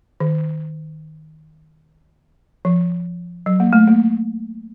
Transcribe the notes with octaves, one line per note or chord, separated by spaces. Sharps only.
D#3
F3
F#3
A#3
A3
A#3